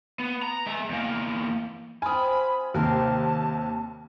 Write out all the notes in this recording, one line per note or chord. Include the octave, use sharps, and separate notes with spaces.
B3
A#5
G#3 E5
E2 A#3
C4 F4 G#5 B5 D#6
D#2 C3 G4 A#4 C5 A5